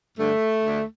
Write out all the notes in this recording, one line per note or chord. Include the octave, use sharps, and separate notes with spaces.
G2 D3 A3
D2 D3